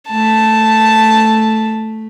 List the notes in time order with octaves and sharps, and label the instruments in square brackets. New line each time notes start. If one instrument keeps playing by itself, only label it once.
[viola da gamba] A3 [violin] A5